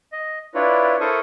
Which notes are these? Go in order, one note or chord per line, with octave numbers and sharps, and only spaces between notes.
D#5
D4 E4 F4 B4 C#5
E4 A4 A#4 C5 C#6 D#6